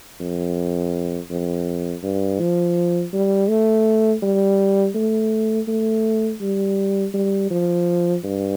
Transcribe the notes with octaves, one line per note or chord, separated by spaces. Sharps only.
F2
F2
G2
F3
G3
A3
G3
A3
A3
G3
G3
F3
G2